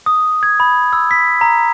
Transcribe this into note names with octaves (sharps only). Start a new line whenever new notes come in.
D#6
G#6
B5
E6
B6
A#5